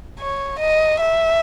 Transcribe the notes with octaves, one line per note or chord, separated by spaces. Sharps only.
C#5
D#5
E5